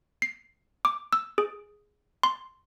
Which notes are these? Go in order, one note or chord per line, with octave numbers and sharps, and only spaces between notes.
C7
D6
E6
G#4
C6